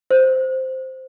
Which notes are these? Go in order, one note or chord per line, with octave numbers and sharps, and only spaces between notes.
C5